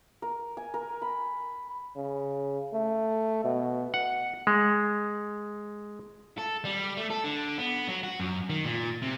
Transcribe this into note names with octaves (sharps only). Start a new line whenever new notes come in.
A#4
G#5
A#4
B5
C#3
A3
B2
F#5
G#3
A4
G3
A3
A4
D3
B3
F#3
F#4
F#2
D#3
A#2
C3